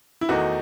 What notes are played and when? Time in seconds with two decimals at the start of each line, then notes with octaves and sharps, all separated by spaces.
0.21 E4
0.29 E2 D#3 A3 D#4 F#4